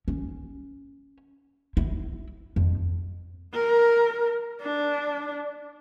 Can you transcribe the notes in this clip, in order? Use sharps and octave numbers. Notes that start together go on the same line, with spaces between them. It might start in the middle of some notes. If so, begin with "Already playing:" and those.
C#4
E4
F2
A#4
D4